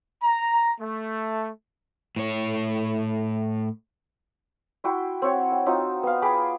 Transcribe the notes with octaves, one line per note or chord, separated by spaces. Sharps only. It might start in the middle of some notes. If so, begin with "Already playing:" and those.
A#5
A3
A2 C#5
E4 F#4 G5 C6
C4 C#5 F#5
G5
C4 D#4 F4 F#4
B3 F5
G#4 G5 B5 D6